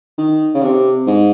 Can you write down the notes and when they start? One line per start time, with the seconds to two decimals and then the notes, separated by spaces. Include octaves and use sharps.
0.18 D#3
0.54 C#3
0.62 C3
1.07 G#2